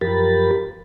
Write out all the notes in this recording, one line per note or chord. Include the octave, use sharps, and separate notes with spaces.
F#2 F3 G4 A#4 B5 A6